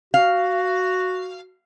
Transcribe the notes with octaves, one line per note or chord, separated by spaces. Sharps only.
F#4 F5